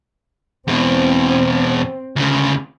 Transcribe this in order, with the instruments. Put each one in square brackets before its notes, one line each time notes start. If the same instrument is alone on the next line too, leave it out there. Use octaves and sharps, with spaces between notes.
[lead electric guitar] E2 B2 [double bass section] C4
[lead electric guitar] D2 C#3